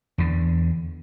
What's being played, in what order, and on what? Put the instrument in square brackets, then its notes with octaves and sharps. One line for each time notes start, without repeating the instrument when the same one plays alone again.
[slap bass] E2 D3